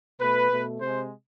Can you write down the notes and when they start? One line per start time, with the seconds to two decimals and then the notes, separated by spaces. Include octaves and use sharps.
0.20 B2 A3 B4
0.51 B2 A3
0.80 C3 G#3 C5